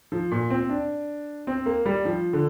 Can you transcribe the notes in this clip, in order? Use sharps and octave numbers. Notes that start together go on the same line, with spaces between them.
F3
A#2
C4
D4
C4
A#3
G3
F3
D3